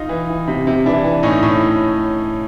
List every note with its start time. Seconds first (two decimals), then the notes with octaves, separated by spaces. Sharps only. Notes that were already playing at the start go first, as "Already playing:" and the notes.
Already playing: D#4 F4
0.09 E3
0.29 E3
0.48 C3
0.67 C3
0.86 E3 D4 E4
1.04 E3
1.23 A2 C#4 D#4
1.43 A2